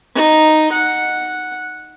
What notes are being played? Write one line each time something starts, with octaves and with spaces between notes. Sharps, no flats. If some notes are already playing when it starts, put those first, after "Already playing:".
D#4
F#5